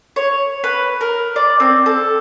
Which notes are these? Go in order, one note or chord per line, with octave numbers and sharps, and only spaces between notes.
C#5
B4
A#4
D5
C4
A4